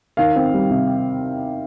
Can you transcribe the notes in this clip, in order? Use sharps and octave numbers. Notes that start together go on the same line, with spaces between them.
D#3 F5
C4
G3
C3